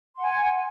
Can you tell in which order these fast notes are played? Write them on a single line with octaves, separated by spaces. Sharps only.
C6 F#5 G#5